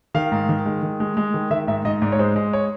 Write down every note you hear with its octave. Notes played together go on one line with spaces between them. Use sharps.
D#3 F5
G#2
D#3
G#3
D#3
G#3
G#3
D#3
D#3 E5
G#2 E5
G#2 D#5
G#2 D5
C#5
G#3 C5
G#3
C#5